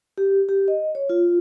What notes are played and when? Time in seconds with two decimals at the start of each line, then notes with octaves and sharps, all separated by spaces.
0.18 G4
0.49 G4
0.68 D#5
0.95 C#5
1.09 F4